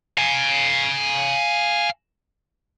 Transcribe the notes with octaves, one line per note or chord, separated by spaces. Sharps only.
F5 G#5